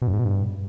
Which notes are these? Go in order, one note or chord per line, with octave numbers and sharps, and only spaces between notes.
B2
F#2
G#2
B2
G2